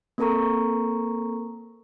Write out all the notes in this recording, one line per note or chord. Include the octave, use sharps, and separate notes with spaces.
A#3 C4 A4 A#4 A#5 C#6